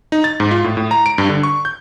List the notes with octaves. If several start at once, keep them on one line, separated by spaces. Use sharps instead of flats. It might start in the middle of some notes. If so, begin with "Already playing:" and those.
D#4
A6
G#2
F4
A2
A2
A#5
D7
G2
D3
C#6
G6